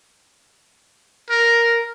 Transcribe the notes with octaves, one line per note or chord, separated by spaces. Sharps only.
A#4